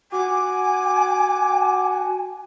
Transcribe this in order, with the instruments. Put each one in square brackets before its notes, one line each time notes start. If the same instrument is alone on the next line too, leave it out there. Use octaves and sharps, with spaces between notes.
[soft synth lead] F#4 [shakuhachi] G#5 [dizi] D6